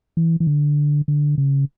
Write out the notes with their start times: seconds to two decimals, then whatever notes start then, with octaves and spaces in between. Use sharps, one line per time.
0.17 E3
0.40 E3
0.47 D3
1.08 D3
1.38 C#3